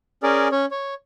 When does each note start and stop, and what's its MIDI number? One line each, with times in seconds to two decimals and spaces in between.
0.23 0.48 61
0.23 0.48 68
0.23 0.48 70
0.23 0.48 74
0.52 0.66 61
0.52 0.66 73
0.71 0.94 73